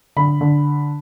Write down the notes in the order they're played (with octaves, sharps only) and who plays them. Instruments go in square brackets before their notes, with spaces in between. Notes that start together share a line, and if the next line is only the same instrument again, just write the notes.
[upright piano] D3 B5
D3